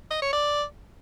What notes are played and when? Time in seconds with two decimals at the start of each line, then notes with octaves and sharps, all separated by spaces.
0.11 D#5
0.22 C#5
0.33 D5